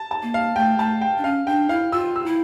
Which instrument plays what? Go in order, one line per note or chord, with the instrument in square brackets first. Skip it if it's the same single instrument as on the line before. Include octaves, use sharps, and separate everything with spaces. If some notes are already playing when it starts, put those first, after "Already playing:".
Already playing: [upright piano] A5
A5
[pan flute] A#3
[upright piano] F5
[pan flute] A3 [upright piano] G5
[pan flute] A3 [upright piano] A5
[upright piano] G5
[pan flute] D4
[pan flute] C#4 [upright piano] F5
[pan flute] D4 [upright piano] G5
[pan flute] E4 [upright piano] F5
[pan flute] F4 [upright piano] E6
[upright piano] E6
[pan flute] E4